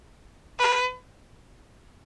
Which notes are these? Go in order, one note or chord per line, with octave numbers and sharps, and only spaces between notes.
B4